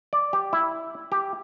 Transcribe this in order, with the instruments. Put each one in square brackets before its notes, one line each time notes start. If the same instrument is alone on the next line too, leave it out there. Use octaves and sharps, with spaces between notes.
[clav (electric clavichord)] D5
G4
E4
G4